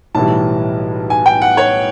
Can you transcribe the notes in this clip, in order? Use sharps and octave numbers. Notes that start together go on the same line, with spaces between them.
B1 A2 E3 G3 A5
G#5
G5
F#5
C#5